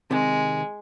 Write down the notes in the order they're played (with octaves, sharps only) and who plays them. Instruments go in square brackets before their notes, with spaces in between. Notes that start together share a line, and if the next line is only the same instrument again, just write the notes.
[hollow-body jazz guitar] C3 D#3 [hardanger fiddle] G#3